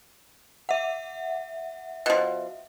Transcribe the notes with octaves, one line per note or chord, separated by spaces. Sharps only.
E5 F#5
B2 F3